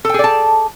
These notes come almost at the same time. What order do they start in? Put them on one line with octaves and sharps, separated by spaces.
A4 G5 G#4 D5 A5